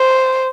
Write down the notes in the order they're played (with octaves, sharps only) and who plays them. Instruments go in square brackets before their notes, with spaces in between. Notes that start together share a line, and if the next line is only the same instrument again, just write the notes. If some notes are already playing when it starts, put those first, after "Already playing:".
Already playing: [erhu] C5